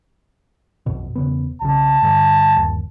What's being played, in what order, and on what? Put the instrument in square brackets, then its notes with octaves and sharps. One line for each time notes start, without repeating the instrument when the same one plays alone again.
[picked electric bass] B1 F2 B2
E1 C#3 B3
[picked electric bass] B1 C#3 [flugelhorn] A5
[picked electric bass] G2 D3
G1 D#2